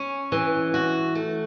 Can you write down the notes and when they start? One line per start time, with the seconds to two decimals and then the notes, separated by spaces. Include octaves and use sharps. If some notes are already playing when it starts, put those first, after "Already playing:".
Already playing: C#4
0.32 E3
0.74 F#4
1.15 A3